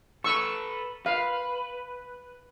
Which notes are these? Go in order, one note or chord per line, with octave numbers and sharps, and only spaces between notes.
A4 B4 C#6 E6
B4 F5